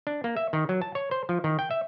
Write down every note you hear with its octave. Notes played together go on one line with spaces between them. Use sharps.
D4
A#3
E5
D#3
F#3
A5
C#5
C5
F3
D#3
G5
E5